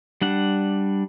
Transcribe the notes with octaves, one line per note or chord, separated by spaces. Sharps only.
G3 D4 F#5